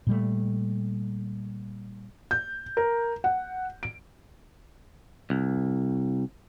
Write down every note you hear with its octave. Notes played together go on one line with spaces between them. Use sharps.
A#2 G3 A3
G6
A#4
F#5
D7
C2